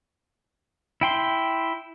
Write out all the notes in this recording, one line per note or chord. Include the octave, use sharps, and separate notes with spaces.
E4 G5 C6